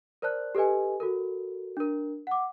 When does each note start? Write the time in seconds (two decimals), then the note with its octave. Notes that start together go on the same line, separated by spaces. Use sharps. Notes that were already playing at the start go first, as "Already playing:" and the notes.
0.22 A#4 C5 D5 A5 F#6
0.55 G4 A4 B4 D#5 G#5
1.00 F#4 A4 A#4
1.77 D4 A#4
2.27 F#5 D6